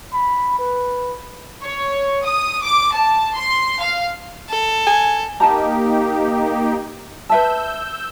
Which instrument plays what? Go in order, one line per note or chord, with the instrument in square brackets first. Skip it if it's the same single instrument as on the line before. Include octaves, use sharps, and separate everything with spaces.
[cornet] B5
B4
[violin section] C#5
D#6
D6
A5
C6
F5
[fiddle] A4
[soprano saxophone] G#5
[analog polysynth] A#3 D#4 G4 [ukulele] D#5 A5 A#5
[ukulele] B4 E5 A5 [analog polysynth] E6 G6